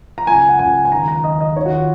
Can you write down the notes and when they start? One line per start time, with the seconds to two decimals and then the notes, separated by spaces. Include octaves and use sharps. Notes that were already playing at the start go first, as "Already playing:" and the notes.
0.18 A#5
0.27 C#2 G#5
0.49 F#5
0.59 C#2 G#5
0.85 G#5
0.92 D#2 A#5
1.08 A#5
1.24 D#2 D#5
1.41 D#5
1.56 D#2 C#5
1.66 F#4
1.73 F4